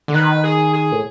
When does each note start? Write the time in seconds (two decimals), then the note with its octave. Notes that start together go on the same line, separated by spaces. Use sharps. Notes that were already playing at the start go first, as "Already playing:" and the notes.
0.08 D3
0.14 D#3 B4
0.44 G#4
0.73 G#4
0.92 A2